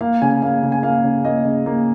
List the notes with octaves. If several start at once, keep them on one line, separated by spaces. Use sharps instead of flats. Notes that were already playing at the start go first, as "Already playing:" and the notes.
A#3 F5
C#3 G#5
A#3 F5
C#3
G#5
A#3 F5
C#3
A#3 D#5
C#3
A#3